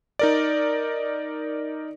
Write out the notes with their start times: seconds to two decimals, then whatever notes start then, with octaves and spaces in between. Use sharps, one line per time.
0.19 D#4 A#4 D5